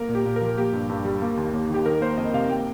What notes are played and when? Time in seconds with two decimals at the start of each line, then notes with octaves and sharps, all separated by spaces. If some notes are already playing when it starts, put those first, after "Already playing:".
Already playing: A#3 A#4
0.09 A#2
0.15 G4
0.25 A#2
0.36 F3 A#4
0.58 A#3 G4
0.73 G2
0.90 G2
1.05 G3
1.22 A#3
1.37 D#2
1.53 D#2
1.69 D#3 G4
1.85 D#3 A#4
2.01 A#3 C5
2.17 F2 D#5
2.34 C3 F5
2.50 A#3 G5